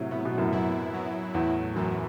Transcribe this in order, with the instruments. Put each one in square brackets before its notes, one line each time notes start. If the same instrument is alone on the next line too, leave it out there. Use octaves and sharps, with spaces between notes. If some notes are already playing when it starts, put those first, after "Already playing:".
Already playing: [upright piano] A2 C3 [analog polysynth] F#3
[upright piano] A2 [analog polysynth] B3
[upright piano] B2
F#2 A2
[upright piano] F#2 [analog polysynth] E4
[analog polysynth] F#3
[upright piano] E2 [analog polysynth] A2
[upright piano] F#2 [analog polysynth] E3